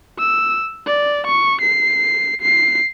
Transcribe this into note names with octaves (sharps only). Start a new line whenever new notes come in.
E6
D5
C#6
C7
C7